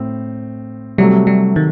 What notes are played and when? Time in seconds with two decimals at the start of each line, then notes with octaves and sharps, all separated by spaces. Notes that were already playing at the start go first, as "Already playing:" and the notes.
Already playing: A2 C4
0.98 C3 F#3 G3 A3
1.27 G3
1.56 D#3